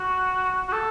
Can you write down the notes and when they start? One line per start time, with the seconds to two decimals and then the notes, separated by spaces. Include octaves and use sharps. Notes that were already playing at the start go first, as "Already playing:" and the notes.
Already playing: F#4
0.68 F#4
0.72 A4